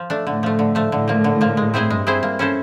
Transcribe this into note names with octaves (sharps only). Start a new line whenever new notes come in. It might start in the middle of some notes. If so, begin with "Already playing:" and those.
Already playing: F3
A3 D4
A2 D3
F3 A3
D3
F3 A3
A2 D3
F3 A#3
D3
F3 A#3
G#3
C4 E4 G#4 C5
G2 G#3
C4 E4 G#4 C5
A#3
C#4 E4 A4 C5